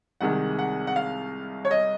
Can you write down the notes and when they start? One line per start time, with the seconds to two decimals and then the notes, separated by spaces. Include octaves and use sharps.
0.21 C2 C3 D#3 G#3 F#5
0.59 F#5
0.87 F#5
0.96 F5
1.65 C#5
1.71 D#5